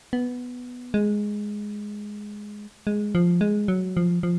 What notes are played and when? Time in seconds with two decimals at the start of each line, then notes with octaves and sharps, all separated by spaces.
0.13 B3
0.94 G#3
2.87 G#3
3.15 F3
3.41 G#3
3.68 F#3
3.97 F3
4.23 F3